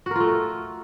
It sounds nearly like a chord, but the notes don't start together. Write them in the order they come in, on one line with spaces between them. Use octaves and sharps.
F#4 A#4 F4 A3